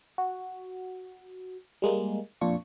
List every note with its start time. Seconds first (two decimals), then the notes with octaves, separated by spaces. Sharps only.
0.18 F#4
1.82 G3 G#3 A#3
2.41 F2 A#2 D4 F4 C#6